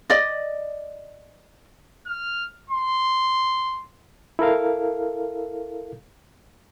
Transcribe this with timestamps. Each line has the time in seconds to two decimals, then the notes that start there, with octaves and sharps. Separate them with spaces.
0.10 D5 D#5
2.07 F6
2.70 C6
4.39 E4 A4 A#4 F5